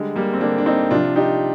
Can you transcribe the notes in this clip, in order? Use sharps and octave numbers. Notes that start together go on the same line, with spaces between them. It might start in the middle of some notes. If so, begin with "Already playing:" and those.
Already playing: D3 G3 G#3
G3 A#3
C4
D3 G3 A#3 D4
D4
C4 D#4
C3 F3 D4 F4
D#4 G4